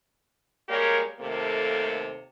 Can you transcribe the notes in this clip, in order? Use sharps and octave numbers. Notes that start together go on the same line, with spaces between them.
G3 G#3 A#3 G4 A#4 C#5
D#2 C3 A3 A#3 A4